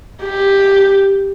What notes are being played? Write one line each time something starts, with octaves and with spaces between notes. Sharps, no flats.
G4